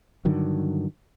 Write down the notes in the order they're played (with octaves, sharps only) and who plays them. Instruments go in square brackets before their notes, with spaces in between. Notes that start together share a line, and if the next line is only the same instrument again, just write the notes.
[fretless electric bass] G2 D3 D#3 F#3